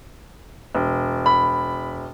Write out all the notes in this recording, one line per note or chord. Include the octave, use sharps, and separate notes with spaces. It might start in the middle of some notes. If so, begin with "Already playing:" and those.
E1
B5